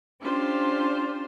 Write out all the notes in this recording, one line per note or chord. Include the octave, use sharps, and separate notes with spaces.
C#4 D4 F4 G4 C5